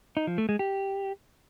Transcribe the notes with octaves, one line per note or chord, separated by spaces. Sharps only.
D#4
F3
A3
G#3
G4